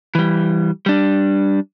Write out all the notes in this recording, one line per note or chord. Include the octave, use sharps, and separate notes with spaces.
E3 G3
G3 D4